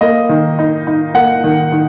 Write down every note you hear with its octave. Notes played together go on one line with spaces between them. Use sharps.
A#3 D#5
D#3
D#4
D#4
A#3 F#5
D#3
D#3